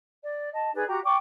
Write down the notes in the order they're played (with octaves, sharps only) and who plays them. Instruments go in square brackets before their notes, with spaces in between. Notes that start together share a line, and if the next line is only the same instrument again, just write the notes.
[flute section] D5
D#5 A5
D#4 G#4 B4 D5
F#4 G4 A#5
D5 G5 C#6 D6